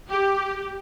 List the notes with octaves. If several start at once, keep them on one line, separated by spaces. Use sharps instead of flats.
G4